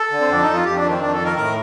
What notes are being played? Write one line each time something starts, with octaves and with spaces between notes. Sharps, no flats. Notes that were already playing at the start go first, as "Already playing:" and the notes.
Already playing: A4
D3
C4
F2 D4
F2 D#4
F4
F2 G4
D4
D#3
C4
F2 D4
A4
D#3
A#4
A2 A#4